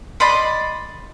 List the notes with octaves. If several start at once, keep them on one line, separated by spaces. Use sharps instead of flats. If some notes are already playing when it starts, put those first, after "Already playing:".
D5 D#5 B5 C6